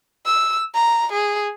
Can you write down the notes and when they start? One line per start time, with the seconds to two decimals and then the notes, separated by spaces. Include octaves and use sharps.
0.25 E6
0.74 A#5
1.13 G#4